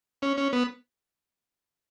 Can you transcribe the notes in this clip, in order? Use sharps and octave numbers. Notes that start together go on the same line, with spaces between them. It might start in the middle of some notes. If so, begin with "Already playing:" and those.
C#4
C#4
B3